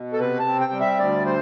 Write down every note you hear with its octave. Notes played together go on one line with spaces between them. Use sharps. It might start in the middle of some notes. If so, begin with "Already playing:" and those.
Already playing: B2
A4
C3 B4
A5
C4
G5
G3
E5
D2 D5
C5